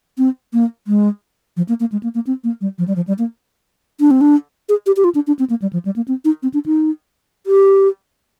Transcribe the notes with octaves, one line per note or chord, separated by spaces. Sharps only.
C4
A#3
G#3
F3
A#3
A#3
G#3
A#3
A#3
C4
A#3
G3
F3
G3
F3
G3
A#3
D4
C4
D4
G#4
G4
G4
F4
D4
D4
C4
A#3
G3
F3
G3
A#3
C4
D#4
C4
D4
D#4
G4